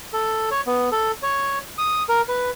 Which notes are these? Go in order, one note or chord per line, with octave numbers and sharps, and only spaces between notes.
A4
C#5
B3
A4
C#5
D#6
A#4
B4